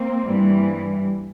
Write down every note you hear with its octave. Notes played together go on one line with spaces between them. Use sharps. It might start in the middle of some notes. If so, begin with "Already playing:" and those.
Already playing: A#3 C4
G2 E3 G3